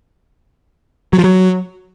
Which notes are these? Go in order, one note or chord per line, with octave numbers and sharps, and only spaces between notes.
F#3
F3
F#3